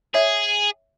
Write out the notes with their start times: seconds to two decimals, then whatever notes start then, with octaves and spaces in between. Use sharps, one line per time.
0.14 G#4 C#5 E5